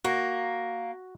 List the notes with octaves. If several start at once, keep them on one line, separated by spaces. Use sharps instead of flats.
A#3 F#4